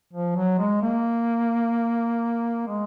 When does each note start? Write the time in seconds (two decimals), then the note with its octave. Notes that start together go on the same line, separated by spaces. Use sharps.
0.13 F3
0.36 F#3
0.59 G#3
0.82 A#3
2.68 G#3